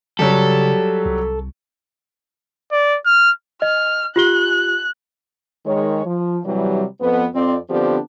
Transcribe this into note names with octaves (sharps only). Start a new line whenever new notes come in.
C#3 F#3 G3 G4 A4
C2
D5
F6
D#5 F6
F4 G4 F#6 G7
D#3 G#3 C#5
F3
C3 E3 F#3 G3
F2 B3
F2 C4 D5
D3 F3 B3 C4 D4 G4